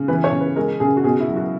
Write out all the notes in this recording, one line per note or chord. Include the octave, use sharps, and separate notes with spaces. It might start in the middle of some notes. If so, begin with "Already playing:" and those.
Already playing: C#3
E3 B4
C#5
C#3
B4
G#3 A#4
C#3 G#4
F#4
B2 G#4
E4
F#3
F#4